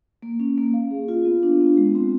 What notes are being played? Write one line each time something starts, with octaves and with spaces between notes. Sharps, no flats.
A#3
C#4
A#3
F5
G#4
F4
B3
D4
B3
G#3
C4